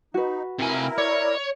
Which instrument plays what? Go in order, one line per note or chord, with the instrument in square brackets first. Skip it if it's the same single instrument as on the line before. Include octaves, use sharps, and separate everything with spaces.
[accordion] D#4 [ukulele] F#4 B4
[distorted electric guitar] C3 G#5 [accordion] E4 A#4
[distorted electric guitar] C#5 [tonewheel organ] D5